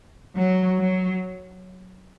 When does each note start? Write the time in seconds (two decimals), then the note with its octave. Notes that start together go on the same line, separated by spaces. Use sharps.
0.36 F#3
0.79 F#3